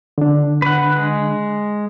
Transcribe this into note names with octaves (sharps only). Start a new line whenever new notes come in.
D3 D4
B4 F#5
G#3